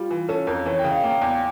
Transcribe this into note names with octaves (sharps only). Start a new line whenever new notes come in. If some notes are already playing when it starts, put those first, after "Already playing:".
Already playing: G3 F4
E3
C#4 A4
F2 A#4
E3 C#5
G5
C#3
F5
A#3 G5
E2 G5